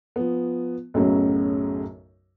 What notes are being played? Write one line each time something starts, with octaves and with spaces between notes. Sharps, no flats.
F3 B3
B1 F#2 A2 C#3 F#3